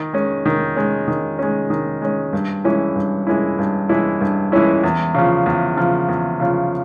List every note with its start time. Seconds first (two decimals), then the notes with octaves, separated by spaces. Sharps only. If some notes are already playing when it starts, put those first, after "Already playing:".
Already playing: D#3
0.13 G#3 C#4
0.45 D#3
0.76 G#3 C#4
1.08 D#3
1.39 G#3 C#4
1.70 D#3
2.02 G#3 C#4
2.33 G2
2.64 E3 G#3 C#4 E4
2.96 G2
3.27 E3 G#3 C#4 E4
3.58 G2
3.89 E3 G#3 C#4 E4
4.21 G2
4.52 E3 G#3 C#4 E4
4.84 E2
5.15 C#3 F3
5.46 E2
5.77 C#3 F3
6.09 E2
6.40 C#3 F3